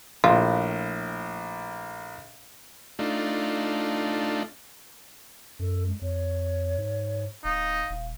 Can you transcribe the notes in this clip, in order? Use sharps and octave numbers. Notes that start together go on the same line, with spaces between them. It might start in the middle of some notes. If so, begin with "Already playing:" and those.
A#1 A2 F4
A3 D4 D#4 F4
F#2 A4
G#3
F2 C#5
G#2
D1 D#4 F5
D#1